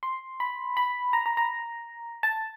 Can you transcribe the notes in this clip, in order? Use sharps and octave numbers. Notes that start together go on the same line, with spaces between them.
C6
B5
B5
A#5
A#5
A#5
A5